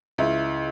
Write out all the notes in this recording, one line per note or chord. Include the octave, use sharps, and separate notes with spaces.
C#2 E4